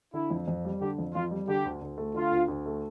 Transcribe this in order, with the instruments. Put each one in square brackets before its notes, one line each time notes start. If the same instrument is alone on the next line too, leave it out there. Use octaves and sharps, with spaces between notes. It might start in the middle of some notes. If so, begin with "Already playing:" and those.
[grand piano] D3 [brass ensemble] E4
[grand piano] F2
F2
G3
[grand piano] D3 [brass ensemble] G4
[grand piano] F2
[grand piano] F2 [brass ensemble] F4
[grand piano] G3
[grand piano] D3 [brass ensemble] G4
[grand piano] D2
D2
A3
[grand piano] D3 [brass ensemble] F4
[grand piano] D2
D2
A3